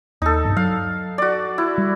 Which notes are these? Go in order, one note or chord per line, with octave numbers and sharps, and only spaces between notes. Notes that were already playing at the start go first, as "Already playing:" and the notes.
D#2 D#4 A4
B1 G2
F#3 F5
F#4 D5
E4
G3